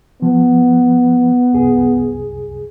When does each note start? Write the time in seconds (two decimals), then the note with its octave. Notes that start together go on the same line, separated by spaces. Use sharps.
0.22 F3 B3
1.53 C2 F#2 G#4